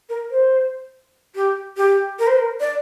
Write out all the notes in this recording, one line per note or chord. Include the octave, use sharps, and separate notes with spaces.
A#4
C5
G4
G4
A#4
C5
A#4
D5